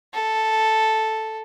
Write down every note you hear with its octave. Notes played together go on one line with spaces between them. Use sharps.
A4